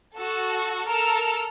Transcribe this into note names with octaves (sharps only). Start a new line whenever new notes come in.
F#4 A4
A4 A#4 E6 F6